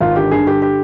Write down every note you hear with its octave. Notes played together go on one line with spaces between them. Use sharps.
G#1 F4
D3 G4
G2 G#4
D3 G4
G4